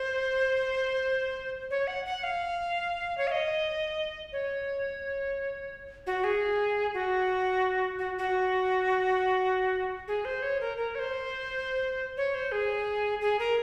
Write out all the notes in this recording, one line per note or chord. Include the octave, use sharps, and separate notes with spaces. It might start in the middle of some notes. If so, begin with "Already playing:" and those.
Already playing: C5
C#5
F#5
F#5
F5
C#5
F5
D#5
C#5
F#4
G#4
F#4
F#4
F#4
G#4
C5
C#5
A#4
A#4
C#5
C5
C#5
C5
G#4
G#4
A#4